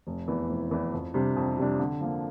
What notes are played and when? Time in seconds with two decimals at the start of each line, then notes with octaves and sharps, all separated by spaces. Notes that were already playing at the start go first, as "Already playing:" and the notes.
0.07 F1
0.28 E2 E3
0.50 F1
0.71 E2 E3
0.93 F2
1.14 C3 G3 D4
1.37 F2
1.57 C3 G3 D4
1.80 D3
2.01 F3 A#3